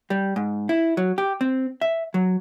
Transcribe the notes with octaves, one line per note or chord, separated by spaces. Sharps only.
G3
G#2
E4
F#3
G4
C4
E5
F#3